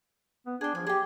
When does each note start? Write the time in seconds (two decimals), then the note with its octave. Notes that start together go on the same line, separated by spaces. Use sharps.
0.46 B3
0.61 D4 G#4 G5
0.75 F3 G#5
0.87 G4 G#4 G5